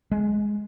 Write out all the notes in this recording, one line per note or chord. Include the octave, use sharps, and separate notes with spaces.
G#3